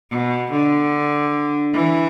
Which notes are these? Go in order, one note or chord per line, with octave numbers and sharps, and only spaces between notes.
B2
D3
E3